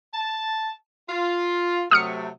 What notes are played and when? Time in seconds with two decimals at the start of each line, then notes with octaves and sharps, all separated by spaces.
0.14 A5
1.09 F4
1.91 C3 F#3 A3 D#6 F6 C#7